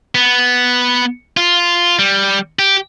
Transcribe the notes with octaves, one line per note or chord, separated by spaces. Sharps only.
B3
F4
G3
G4